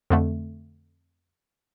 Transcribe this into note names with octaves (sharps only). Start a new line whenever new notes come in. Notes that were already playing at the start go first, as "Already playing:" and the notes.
F2 D3 A3